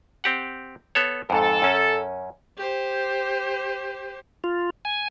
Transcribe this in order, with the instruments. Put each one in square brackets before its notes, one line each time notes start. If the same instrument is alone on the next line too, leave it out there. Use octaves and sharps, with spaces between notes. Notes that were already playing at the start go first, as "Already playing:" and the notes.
[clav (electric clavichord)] C4 G4 F#5
B3 A4 C#5
[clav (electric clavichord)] F2 G#2 [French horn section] A4
[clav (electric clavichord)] F#2 C#4
[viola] G4 C5
[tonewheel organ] F4
G#5